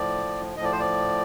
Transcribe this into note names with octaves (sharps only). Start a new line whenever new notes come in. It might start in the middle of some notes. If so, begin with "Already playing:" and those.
Already playing: A2 F3 D5
A2 F3 D#5
D5
C5
D5